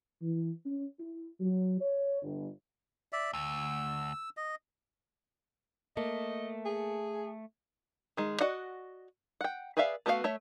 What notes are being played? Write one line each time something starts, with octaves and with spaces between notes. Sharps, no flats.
E3
C#4
E4
F#3
C#5
G1
D5 E5
D2 E6
D#5
A3 A#3 D#5
G#4
D#3 G#3
F#4 D5 D#5 F#5
F#5 G5
G#4 B4 D5 E5 F5
A3 B3 F#4 A#4 F5
A3 C#5 E5